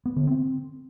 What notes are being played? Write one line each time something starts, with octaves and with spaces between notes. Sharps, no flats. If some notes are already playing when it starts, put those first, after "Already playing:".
B3
D3
C4